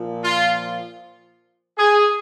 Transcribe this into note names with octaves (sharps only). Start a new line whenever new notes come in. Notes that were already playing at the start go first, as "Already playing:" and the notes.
Already playing: A#2 F3
F4
G#4